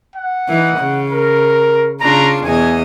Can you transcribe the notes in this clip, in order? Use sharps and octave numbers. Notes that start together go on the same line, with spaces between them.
F#5
E3 D#4
C#3
A#4
C#3 D4 F4 A#5
E2 B2 D#5 G#5